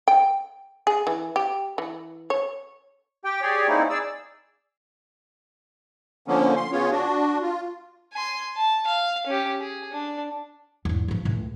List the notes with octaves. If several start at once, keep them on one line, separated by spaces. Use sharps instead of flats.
G5
G#4
E3
G4
E3
C#5
G4 G5
G4 G#4 C#5 D5
A#3 C4 C#4 D#4 E4
G#4 D5 E6
D3 F3 A#3 B3 C#4
C6
C#3 B3 C#4 F4 C#5
D4 F#4
F4
G#5 C6
A5
F5
C#4 G4
G#4
D4
E2 G#2
A2 F3
C#2 A2